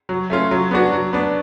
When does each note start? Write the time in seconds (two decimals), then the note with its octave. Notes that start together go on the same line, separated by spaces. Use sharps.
0.09 F#3
0.30 A3 C#4 F4
0.51 F#3
0.71 B3 D4 F#4
0.92 F#3
1.13 B3 D4